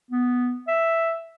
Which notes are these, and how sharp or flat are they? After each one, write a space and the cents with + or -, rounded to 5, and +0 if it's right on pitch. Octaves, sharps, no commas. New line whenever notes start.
B3 +0
E5 +0